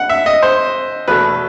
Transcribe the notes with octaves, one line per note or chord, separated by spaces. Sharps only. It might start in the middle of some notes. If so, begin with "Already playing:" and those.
Already playing: F#5
E5
D#5
C5
E2 B2 A3 B4